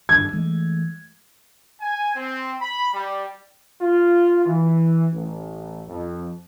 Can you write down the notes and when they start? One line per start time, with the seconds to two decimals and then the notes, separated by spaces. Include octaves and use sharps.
0.09 G#1 G2 D3 G#6
0.33 E3 G#3 A3
1.80 G#5
2.15 C4
2.60 B5
2.93 G3
3.81 F4
4.46 E3
5.13 A1
5.88 F2